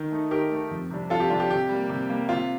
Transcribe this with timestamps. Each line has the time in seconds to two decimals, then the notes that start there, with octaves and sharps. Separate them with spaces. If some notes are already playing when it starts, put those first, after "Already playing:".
Already playing: D#3
0.12 A3 D#4
0.31 D#3 G4 A#4
0.52 A3 D#4
0.71 F2
0.90 C3 G3 D4
1.10 F2 F4 A4
1.20 G4
1.30 C3 G3 D4 F4
1.40 G4
1.51 C3 G4
1.69 G3 A#3
1.89 C3
2.10 G3 A#3
2.29 C3 F4